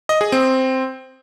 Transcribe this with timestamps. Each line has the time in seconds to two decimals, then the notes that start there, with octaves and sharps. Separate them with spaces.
0.09 D#5
0.21 G#4
0.32 C4